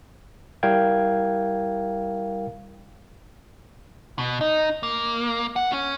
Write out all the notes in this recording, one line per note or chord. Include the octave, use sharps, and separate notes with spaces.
G3 E4 A#4 F5 G5 G#6
B2
D#4
A#3
F#5
C#4